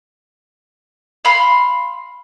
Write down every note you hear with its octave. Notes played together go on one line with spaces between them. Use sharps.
F5 B5 C6